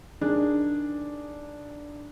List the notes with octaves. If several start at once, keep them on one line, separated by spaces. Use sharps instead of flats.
D#3 D4 G#4